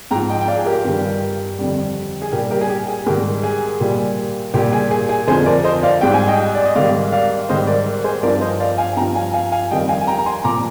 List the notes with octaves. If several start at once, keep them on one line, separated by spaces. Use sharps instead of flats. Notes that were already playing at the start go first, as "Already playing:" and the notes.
G#2 F3 G5 A#5
D#5 G5
G5
D5 F5
G#4
G4 A#4
G2 D#3 G3
F2 D3 G3
G#4
A#2 G3 G4 A#4
G4 A#4
G#4
G4
G#4
G#2 D#3 G3 G4 A#4
G#4
A#2 G3
A#2 G3 G4
G#4
G#4
G#4
F2 D3 F3 G#4 C5
A#4 D5
C5 D#5
D5 F5
G#2 G3 G5
G#5
D#5 G5
D5
D#5
G#2 D#3 G3 D5 F5
D5 F5
G#2 D#3 G3 C5 D#5
A#4 D5
G#4 C5
G2 F3 A#4 D5
C5 D#5
D5 F5
F5 G#5
G2 F3 G5 A#5
F5 G#5
F5 G#5
F5 G#5
F2 D#3 G3 D#5 G5
F5 G#5
G#5
G5 A#5
A#5
G#5 C6
A#2 F3 A#5 D6